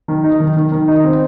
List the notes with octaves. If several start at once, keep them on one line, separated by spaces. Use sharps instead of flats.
D#3
D#4
D#3
D#3
D#3
D#4
C4